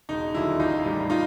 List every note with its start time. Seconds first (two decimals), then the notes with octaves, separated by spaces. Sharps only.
0.09 E1 D#4
0.34 D#2 D3 F#3 E4
0.59 A1 D#4 F4
0.85 A2 E3 G3
1.10 D#4 F4